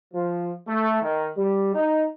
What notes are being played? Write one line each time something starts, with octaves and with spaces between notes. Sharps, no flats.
F3
A3
D#3
G3
D#4